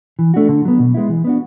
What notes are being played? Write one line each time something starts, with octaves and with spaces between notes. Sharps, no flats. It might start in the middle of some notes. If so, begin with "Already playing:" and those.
E3
A3 D4 F#4
D3
F#3 B3
B2
G#3 B3 E4
E3
B3 D4 F#4